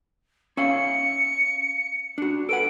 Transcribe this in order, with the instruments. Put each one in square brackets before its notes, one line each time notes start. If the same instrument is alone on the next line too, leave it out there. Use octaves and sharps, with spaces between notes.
[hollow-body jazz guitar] C#4 E5 F5 [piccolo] C#7
[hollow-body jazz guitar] D4 F#4
[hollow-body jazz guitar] A4 B4 F#5 [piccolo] D7